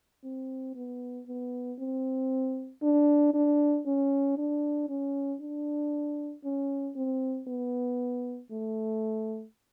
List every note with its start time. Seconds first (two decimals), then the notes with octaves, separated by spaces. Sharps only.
0.24 C4
0.75 B3
1.27 B3
1.79 C4
2.83 D4
3.34 D4
3.86 C#4
4.38 D4
4.89 C#4
5.41 D4
6.44 C#4
6.96 C4
7.48 B3
8.51 A3